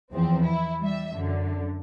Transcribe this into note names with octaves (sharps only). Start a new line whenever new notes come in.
E2 F3 C4
E4
G3 E5
F#2 D3